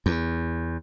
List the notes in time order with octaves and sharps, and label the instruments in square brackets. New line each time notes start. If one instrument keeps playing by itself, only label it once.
[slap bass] E2